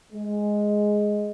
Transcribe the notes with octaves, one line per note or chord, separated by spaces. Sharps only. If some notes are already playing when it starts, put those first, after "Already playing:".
G#3